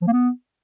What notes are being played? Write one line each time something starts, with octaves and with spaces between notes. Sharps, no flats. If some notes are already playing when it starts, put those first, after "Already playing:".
F3
A#3
B3